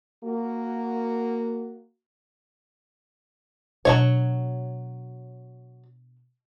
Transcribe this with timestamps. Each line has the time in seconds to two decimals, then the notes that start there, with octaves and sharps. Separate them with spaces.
0.24 A#3 F#4
3.85 B2 F#3 A3 D4 C#5